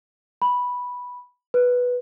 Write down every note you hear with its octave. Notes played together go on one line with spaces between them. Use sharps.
B5
B4